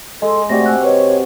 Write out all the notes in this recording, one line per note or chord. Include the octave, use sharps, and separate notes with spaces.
G#3 A4 D#5 G#5
C3 A3 F#4 G4 D5 A#6
G#5 E6 F#6
B4 C#5 D#5